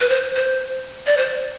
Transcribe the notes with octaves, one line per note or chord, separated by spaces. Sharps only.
B4
C5
C5
D5
C5